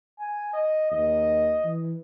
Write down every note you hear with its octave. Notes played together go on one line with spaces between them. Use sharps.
G#5
D#5
D#2 D#5
E3